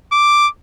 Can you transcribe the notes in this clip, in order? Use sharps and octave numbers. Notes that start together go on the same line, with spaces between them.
D6